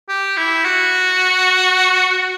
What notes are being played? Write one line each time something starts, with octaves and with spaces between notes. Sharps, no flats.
G4
E4
F#4